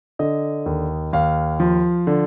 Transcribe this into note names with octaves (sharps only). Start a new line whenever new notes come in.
D3 D#5
D#2
D#2 F5
F3
D3